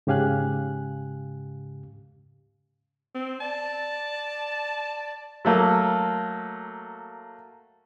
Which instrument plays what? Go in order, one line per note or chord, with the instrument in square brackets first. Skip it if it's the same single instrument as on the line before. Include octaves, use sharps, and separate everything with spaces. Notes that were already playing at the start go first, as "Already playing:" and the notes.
[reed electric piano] G#2 C#3 G4 F5 G#5 F#6
[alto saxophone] C4
[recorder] D5 [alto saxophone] A5
[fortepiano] F#3 A3 A#3